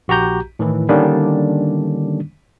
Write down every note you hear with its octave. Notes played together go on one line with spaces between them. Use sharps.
A#1 F#4 G4 A#5 G6
A2 D#3 E3
D3 D#3 G3 A#3 C#4 D4